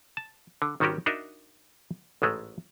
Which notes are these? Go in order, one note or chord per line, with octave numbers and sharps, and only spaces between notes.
A5
D3
G#1 D#3 G3 C#4 F#4 G4
D4 D#4 F#4 A#4 D#5 E5
A1 G#2 G#3 A3